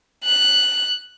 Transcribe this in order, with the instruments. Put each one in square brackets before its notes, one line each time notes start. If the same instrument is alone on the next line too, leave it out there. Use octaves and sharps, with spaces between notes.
[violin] F#6